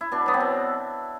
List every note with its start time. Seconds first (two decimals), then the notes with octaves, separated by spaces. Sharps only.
0.01 E4
0.12 B2 D4
0.26 F#3 B3
0.34 C4
0.40 B2